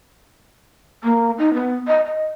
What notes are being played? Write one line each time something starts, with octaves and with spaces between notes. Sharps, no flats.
A#3
D#4
B3
D#5
D#5